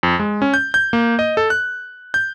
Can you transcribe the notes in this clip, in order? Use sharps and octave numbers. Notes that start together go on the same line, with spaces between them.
F2
G#3
C#4
G6
G6
A#3
D#5
A4
F#6
G6